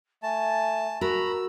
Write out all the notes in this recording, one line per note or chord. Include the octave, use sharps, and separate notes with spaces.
A3 G#5 A5
F#4 A#4 A#5 B5 C#6 E6